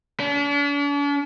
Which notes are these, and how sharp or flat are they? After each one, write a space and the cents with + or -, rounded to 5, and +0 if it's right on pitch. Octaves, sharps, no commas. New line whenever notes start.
D4 -45